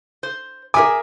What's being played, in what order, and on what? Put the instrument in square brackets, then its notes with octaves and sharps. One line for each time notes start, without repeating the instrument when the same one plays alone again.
[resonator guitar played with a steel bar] C5
[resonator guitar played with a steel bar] G#4 E5 G#5 [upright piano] A#4 D6